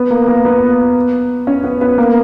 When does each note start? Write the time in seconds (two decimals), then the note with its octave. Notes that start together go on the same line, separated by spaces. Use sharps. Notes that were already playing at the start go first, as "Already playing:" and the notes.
Already playing: B3 B4
0.10 A#3 A#4
0.28 A#3 A#4
0.45 B3 B4
1.47 C#4 C#5
1.64 B3 B4
1.81 B3 B4
1.98 A#3 A#4